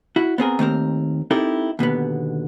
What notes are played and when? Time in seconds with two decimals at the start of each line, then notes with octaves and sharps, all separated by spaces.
0.16 E4 F#4
0.38 B3 C4 G#4 A#4
0.59 D#2 A3 C4 A#4
1.31 C4 D#4 E4 G4 A4 A#4
1.79 D#2 B2 D3 B3